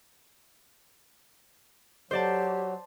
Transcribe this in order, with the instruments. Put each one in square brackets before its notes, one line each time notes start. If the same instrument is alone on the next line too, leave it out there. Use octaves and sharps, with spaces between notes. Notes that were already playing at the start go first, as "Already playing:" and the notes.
[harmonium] F#3 [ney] G4 [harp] C5 D5 A5